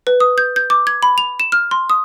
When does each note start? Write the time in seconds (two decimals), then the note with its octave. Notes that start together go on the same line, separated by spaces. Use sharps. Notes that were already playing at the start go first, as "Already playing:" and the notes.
0.07 B4
0.20 D#6
0.38 G6
0.56 G6
0.70 D6
0.87 G#6
1.03 B5
1.18 F7
1.40 E7
1.52 F6
1.71 C6
1.90 D#6